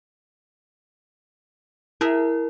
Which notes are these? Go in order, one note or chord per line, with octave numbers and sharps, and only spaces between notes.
E4 G#4 A#4 E5